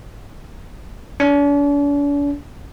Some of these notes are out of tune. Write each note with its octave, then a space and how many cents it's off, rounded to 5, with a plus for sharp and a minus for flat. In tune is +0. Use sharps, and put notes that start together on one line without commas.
D4 -45